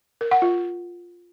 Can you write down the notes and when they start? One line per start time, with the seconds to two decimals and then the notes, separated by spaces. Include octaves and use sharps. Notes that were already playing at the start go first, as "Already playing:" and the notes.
0.21 A#4
0.31 F#5
0.42 F4